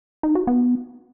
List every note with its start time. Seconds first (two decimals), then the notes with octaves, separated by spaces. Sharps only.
0.23 D#4
0.35 F#4
0.47 B3